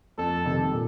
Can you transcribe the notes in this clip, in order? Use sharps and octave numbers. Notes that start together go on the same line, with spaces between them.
F2 A4
C3 D#3 G3
A#2